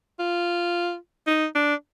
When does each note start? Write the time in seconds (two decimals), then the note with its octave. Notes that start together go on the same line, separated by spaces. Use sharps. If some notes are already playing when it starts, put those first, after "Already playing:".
0.19 F4
1.27 D#4
1.55 D4